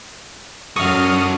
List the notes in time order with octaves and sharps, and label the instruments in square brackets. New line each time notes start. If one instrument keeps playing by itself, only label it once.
[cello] F#2 [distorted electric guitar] F#4 A4 [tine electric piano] C#6 [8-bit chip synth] D#6 F6